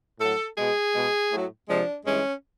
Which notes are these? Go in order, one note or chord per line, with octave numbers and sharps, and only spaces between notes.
A2 F#3 A4
B2 G#3 G#4
B2 G#3
A2 F#3
C3 F3 G#3 D4
G2 E3 G#3 C#4